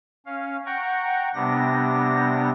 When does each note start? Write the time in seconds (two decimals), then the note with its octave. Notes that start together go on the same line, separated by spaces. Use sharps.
0.26 C#4 F5
0.66 F#5 G5 A#5 C#6
1.35 C3 G3 B3 D4 G4 A#6